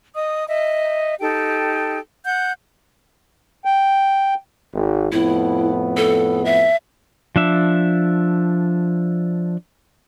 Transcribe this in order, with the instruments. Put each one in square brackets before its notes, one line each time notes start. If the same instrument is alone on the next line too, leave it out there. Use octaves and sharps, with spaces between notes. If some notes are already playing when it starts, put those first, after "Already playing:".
[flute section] D#5 D#6
D#5 E5
D#4 G4 A4 G5
F#5 G6
[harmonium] G5
[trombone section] G#1
[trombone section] F2 A2 B3 [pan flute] E4
[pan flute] A4
E5
[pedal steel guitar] F3 D4 E5